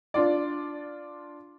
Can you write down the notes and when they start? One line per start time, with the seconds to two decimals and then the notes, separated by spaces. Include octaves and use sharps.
0.14 D4 F4 D5